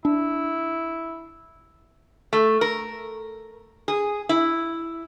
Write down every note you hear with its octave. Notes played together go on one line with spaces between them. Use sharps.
D4 E4
A3
A#4
G#4
E4